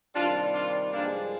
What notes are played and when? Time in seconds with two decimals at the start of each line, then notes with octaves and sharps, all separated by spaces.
0.15 C3 D#3 G3 D4 F4
0.54 D4 F4
0.93 G2 F3 G#3 A#3 D4